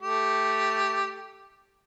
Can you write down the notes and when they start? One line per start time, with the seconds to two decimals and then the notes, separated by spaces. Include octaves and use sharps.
0.01 A3 G4